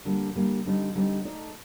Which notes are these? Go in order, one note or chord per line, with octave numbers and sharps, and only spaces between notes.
D3 G3 A#3
D3 G3 A#3
D3 G3 C4 D#4
D3 G3 C4 D#4
A3 D#4 A4 D5